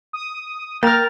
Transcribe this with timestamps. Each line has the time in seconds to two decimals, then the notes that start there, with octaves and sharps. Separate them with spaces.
0.13 D#6
0.83 A#3 A#4 G5 A#5 F6 A6